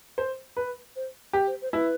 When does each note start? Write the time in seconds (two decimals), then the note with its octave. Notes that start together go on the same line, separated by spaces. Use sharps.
0.18 C5
0.57 B4
0.96 C5
1.33 G4
1.47 C5
1.62 C5
1.72 E4 B4